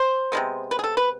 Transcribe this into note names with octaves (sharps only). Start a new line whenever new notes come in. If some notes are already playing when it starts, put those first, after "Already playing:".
Already playing: C5
C3 F3 G#3 B3
B4
G#4
A4
B4